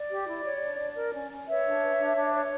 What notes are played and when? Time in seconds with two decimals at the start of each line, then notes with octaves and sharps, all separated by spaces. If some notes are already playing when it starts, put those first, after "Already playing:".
Already playing: D5
0.10 G4
0.27 E4
0.45 C#5
0.62 D4
0.79 D4
0.96 A#4
1.13 C#4
1.31 C#4
1.47 B4 C#5 E5
1.64 D4
1.81 B4
1.99 D4
2.16 D4
2.33 C#5